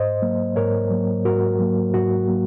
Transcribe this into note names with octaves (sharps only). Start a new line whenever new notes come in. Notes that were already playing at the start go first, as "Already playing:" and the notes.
Already playing: G#2 C5 D#5
F#3 A#3
G#2 A#4 C#5
F#3 A#3
G#2 F#4 A#4
F#3 A#3
G#2 F#4
F#3 A#3